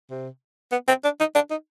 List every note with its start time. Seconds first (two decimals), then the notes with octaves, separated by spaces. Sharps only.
0.10 C3
0.72 B3
0.88 C4
1.04 D4
1.20 D#4
1.35 D4
1.51 D#4